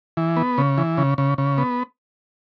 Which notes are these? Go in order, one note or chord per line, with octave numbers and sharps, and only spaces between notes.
E3
B3
C#3
E3
C#3
C#3
C#3
B3